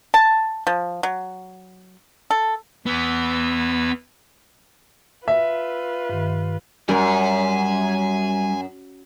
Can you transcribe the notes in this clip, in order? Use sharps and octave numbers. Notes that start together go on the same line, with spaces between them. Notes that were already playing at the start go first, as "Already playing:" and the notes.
A5
F3
F#3
A4
E2 E3 B3 E6
F4 B4 E5
G2 D#3
F#2 G3 A#4 G#5